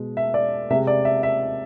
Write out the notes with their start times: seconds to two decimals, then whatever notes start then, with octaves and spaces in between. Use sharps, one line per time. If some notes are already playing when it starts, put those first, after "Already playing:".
Already playing: B2 G#3
0.17 E5
0.34 D5
0.70 C3 G#3 E5
0.87 D5
1.05 E5
1.23 E5